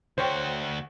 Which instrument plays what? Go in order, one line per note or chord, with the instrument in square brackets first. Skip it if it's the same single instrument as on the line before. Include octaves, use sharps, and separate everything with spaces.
[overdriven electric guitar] D2 F#4 [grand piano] C5 C#5 G5